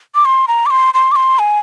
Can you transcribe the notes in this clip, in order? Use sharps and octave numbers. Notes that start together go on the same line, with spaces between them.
D6
C6
A#5
D6
C6
C6
D6
C6
G#5